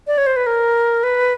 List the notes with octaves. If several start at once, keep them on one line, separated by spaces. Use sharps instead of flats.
D5
C#5
C5
B4
A#4
B4